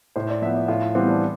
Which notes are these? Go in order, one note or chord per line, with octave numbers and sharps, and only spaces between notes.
A2 C5
D5
F3 B3 E5
D5
A2 F4
E3 G3 B3 C4
D4